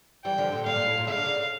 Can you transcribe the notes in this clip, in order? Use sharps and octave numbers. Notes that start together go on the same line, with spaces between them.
E3 G3 G5
D3 F3
A#2 D3
A#2 D3 F5
A#2
A2
A#2
C#3 F5
D3
C#3